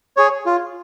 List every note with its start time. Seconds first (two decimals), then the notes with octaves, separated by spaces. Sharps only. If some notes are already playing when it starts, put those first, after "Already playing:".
0.17 G#4 C#5
0.46 F4